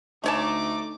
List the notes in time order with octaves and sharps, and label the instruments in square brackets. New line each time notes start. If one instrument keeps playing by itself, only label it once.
[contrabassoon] D2 [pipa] A3 C#5 A5 [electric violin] D#4 [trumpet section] D6